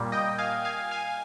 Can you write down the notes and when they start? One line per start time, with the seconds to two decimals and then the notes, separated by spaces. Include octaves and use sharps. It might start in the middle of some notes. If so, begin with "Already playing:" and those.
Already playing: A#2 G3 A#3
0.12 D#5 G5
0.38 F5 G#5
0.65 F5 G#5
0.91 F5 G#5